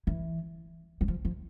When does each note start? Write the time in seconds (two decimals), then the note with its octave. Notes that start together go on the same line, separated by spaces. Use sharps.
0.07 E3
1.01 F#3
1.08 F3
1.25 F3